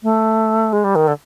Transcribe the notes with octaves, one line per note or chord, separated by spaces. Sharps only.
A3
G#3
G3
D#3
D3